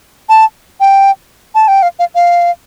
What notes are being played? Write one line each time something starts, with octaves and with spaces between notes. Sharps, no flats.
A5
G5
A5
G5
F5
F5
F5